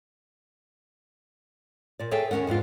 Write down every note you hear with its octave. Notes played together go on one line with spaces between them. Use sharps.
A#2 D5
G#4 A4 C#5 E5 G5 G#5
D#2 G#2 C#4 A#4 F#5
F2 G#2 D4 F4